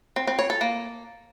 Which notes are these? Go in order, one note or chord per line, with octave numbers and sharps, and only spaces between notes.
C4
C4
C#5
A4
A#3